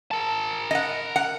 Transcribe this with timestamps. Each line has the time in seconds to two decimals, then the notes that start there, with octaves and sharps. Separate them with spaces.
0.11 A#4 A5
0.71 D#5 F#5
1.16 F#5